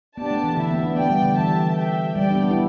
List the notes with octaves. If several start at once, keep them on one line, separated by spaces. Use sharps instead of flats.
B3 D4 G4 D5 A5
A3
E3
D3 E4 G4 E5
B3
D4
B3 G4 D5 G5
G3
D3
E3 G4 E5 A5
G4 E5 G5
G3 G4 D5 G5
D4
B3
E4